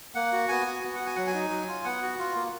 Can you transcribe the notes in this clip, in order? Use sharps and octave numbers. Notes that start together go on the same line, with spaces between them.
A#3 F#5
F#4
B3 G#5
F#4
B3
F#4 F#5
G#5
F#3 F#5
G#5
D#4
F#3
F4
B3 F#5
F#4
F4
A#3